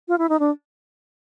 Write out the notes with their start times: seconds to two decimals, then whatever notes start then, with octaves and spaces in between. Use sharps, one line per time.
0.08 F4
0.18 E4
0.29 D#4
0.39 D4